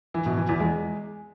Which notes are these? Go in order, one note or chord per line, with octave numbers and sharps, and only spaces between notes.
E3
B2
E3
E2
G#3